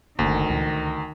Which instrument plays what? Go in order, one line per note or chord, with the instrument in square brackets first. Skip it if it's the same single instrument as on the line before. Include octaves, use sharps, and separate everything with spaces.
[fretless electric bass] F#1 A#3 [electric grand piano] D2 [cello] D#3
[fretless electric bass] C#2 A#2 E3